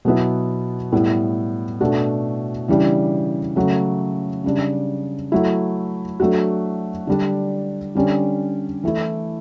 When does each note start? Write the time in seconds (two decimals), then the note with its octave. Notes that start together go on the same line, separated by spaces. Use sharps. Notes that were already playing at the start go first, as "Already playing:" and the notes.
0.05 B2 F#3 B3 E4
0.92 A2 G3 B3 E4
1.81 B2 A3 D4 F#4
2.68 C#3 E3 G3 D4
3.56 C#3 F#3 A3
4.44 C#3 G3 D4
5.32 F#3 A3 E4
6.20 F#3 A3 D4 F#4
7.07 D3 G3 D4
7.95 D3 G3 C#4
8.84 E3 A3 E4